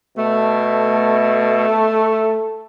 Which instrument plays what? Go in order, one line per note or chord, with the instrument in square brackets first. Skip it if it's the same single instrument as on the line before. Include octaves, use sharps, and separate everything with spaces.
[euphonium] B2 [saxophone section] A3
[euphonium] A4